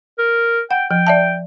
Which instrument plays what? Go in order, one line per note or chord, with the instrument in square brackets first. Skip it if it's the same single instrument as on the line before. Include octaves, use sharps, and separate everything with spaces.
[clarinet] A#4
[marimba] F#5 [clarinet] G5
[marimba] F3 [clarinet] G5
[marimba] D5 E5 A5